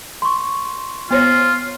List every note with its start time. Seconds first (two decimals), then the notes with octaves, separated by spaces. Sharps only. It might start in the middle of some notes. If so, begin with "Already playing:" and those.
0.22 C6 C#6
1.11 B3 F4 C5 C#5